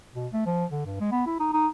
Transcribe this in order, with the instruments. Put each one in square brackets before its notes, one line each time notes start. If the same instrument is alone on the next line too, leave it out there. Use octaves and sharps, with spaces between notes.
[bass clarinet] B2
A3
F3
D3
G2
G#3
B3
E4
D#4
D#4